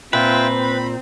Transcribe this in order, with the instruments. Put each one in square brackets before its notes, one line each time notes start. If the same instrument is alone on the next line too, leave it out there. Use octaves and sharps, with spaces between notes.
[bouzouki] A#2 [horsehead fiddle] C4 [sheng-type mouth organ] F4 E5 G5 [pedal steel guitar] B4
[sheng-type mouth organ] B5